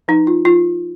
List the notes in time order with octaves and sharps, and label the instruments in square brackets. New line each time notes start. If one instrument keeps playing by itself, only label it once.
[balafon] F3 D#4
F4
F3 F4